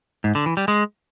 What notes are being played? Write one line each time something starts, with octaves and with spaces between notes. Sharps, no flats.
G#2
D3
E3
G3
G#3